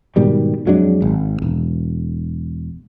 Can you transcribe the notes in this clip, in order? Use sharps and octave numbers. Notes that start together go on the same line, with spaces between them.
G#2 B2 D#3 G3
F2 F#3 G#3 D4
G#1
E1